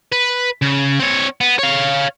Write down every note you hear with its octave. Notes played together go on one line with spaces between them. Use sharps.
B4
C#3
C4 C#5
B3
C#5 F5